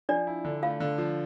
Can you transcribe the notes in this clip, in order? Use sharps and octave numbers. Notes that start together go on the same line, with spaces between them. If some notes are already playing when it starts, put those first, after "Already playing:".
F3 D4 D5
E4
D3
A3 F4 F5
D3
F3